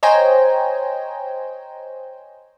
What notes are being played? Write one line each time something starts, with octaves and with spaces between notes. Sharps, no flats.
C5 C#5 D#5 G5 G#5 A#5